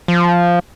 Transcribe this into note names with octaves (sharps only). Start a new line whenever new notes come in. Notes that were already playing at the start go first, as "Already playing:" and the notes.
F3